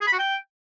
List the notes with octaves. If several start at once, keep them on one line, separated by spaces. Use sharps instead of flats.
G#4
B5
F#4
G5